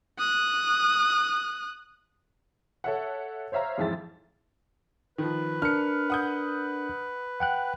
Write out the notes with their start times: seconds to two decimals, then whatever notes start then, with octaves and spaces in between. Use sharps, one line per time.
0.19 D#6 F#6
2.84 A4 C#5 E5 F#5
3.52 C5 C#5 E5 F5 A#5
3.78 F2 G#2 E3 E5 A6
5.18 D#3 F3 B4
5.62 D4 A#4 F6 C#7
6.10 F#5 D#6 G6
7.40 F#5 G5 F#6